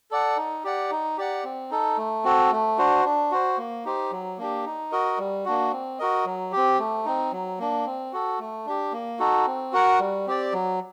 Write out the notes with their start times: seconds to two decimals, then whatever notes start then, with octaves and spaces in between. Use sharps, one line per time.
0.11 A4 D5 F#5
0.37 D#4
0.64 G4 D5 F#5
0.91 D#4
1.18 G4 D5 F#5
1.44 C4
1.71 D#4 A4
1.97 A3
2.24 C4 F#4 A4
2.51 A3
2.78 D4 F#4 C5
3.05 D4
3.32 F#4 C5
3.58 A#3
3.85 D#4 G4 C5
4.12 F#3
4.38 A#3 D4 G4
4.65 D#4
4.92 F#4 A#4 D#5
5.18 G3
5.45 A#3 D4 F#4
5.72 C4
5.99 F#4 A#4 D#5
6.25 F#3
6.52 C4 G4
6.79 A3
7.05 C4 D#4
7.32 F#3
7.59 A#3 D4
7.86 C4
8.13 F#4 A4
8.39 A3
8.66 D4 G4
8.92 A#3
9.19 D#4 F#4 A4
9.46 C4
9.73 F#4 A#4 F#5
10.00 G3
10.27 C4 G4 D5
10.53 F#3